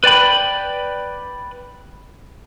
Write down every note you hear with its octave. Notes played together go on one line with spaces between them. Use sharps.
B4 D5 G5 B5